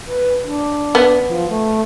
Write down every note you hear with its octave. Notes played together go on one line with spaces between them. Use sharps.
B4
D4
B3
F3
A3